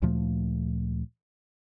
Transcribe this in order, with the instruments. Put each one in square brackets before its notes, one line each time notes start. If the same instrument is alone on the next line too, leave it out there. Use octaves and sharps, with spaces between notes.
[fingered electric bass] D2 A#2 F3 A3